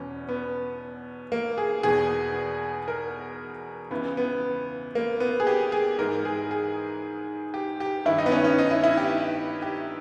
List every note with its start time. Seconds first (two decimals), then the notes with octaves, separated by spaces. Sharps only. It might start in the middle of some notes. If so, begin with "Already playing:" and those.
Already playing: E2 B2 C#4
0.29 B3
1.32 A#3
1.58 G#4
1.83 E2 B2 G#4
2.88 A#4
3.91 C#2 C#3 E3 B3
4.17 B3
4.95 A#3
5.20 B3
5.40 G#4
5.47 G4
5.72 G#4
5.98 G#2 E3 A#4
6.25 G#4
6.51 G#4
7.54 G4
7.80 G4
8.05 G2 D#3 E4
8.18 D#4
8.26 B3
8.32 C#4
8.44 C#4
8.58 D#4
8.71 E4
8.84 E4
8.97 G4
9.62 G4